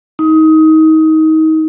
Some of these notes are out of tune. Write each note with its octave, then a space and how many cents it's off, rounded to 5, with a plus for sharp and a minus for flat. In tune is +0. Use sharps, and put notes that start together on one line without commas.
D#4 +25